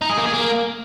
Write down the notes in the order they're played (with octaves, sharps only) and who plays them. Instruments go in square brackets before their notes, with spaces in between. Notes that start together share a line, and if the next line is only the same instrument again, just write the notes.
[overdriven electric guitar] D#4
G#4
A#3
G#4
A#3